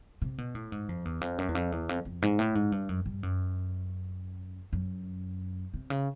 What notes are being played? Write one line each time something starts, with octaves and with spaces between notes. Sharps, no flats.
C3
B2
A2
G#2
F2
E2
F2
F#2
E2
F2
E2
F2
F2
G#2
A2
G#2
G2
F#2
G2
F#2
F#2
C3
C#3